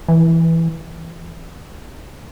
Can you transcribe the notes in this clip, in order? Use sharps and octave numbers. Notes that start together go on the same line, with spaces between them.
E3